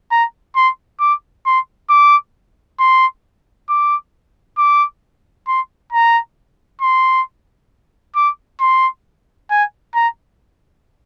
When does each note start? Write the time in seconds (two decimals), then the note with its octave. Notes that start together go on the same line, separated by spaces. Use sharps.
0.11 A#5
0.56 C6
1.00 D6
1.46 C6
1.90 D6
2.80 C6
3.69 D6
4.58 D6
5.48 C6
5.93 A#5
6.81 C6
8.16 D6
8.61 C6
9.51 G#5
9.95 A#5